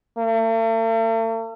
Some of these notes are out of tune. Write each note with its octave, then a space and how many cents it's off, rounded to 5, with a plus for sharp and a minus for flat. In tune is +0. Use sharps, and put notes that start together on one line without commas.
A3 +45